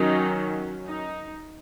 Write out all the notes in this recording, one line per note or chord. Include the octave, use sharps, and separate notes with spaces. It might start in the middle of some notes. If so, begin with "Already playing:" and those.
Already playing: D#3 F#3 C#4 D#4
D#4